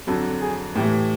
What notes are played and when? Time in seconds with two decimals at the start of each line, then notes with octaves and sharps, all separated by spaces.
0.07 F2 D3 F#3 A4
0.41 G#4
0.75 A2 E3 G4